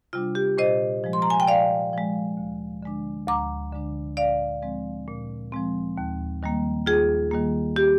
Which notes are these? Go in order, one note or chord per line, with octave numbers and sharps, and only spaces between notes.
C3 G3 D4 F4
G4
A#2 C5 D#5
F3 G#3
C6
A#5
G#5
G5
A#2 D5 F5
F3 G#3
D2
D3 G#3 D4
D2 A#5 D6
D3 G#3 D4
A#2 D5 F5
F3 G#3 C4
A#2
F3 G#3 C4
D#2
D#3 G3 A#3
D#2 F4 G#4
D#3 G3 A#3
G4